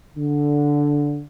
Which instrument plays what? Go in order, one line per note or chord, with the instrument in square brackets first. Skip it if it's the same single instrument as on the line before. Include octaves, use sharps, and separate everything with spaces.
[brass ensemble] D3